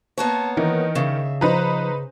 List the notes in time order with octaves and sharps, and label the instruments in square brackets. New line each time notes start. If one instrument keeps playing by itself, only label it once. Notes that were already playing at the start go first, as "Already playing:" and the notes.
[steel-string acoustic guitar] A#3 B3 C#5 [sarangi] A5
[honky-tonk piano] D#3 [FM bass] E3 [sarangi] D#4
[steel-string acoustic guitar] C#3 [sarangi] E5
[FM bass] F3 [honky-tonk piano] D#4 B4 A#5 [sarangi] C5